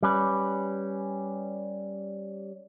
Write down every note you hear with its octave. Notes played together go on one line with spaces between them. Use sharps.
G3 C#4 B4